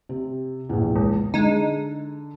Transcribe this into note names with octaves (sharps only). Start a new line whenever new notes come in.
C3
A#1 E2
C#2
D3 G#3 D#4